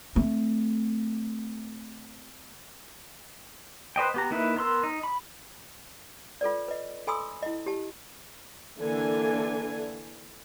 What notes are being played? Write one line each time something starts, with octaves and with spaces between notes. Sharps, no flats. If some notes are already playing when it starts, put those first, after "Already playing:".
A3 C4
B4 C5 D#5 G5
B3 G4 A#5
A#3 D#4 E4 B4 E5
B3 A#4 C6 E6
D#4
B5
F4 A4 B4 D5
B4 D#5
A4 G#5 B5 C6 D#6 E6
E4 D#5
G4 A5
D3 E3 A#3 D4 A4 G#5